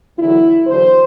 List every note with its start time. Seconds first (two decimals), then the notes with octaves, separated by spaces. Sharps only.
0.19 E2 D3 F#3 E4
0.67 E2 D3 F#3 C5